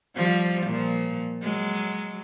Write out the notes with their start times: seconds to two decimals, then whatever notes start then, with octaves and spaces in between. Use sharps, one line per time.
0.15 F3 G3
0.66 A#2 F3
1.42 F#3 G#3